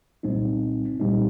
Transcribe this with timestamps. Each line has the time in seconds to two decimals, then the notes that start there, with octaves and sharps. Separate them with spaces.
0.23 C2 A#2 G3 C4 D#4
1.00 C2 A#2 G3 C4 D#4